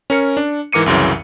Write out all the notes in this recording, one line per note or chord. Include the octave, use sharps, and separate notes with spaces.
C#4 A#4 C#7
D4
G#2 E3 A#4 D6 C#7 D#7
C2 F#2 C#3 E3